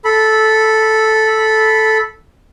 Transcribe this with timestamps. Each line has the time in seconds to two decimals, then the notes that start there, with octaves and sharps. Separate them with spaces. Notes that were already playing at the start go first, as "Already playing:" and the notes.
0.05 A4 B5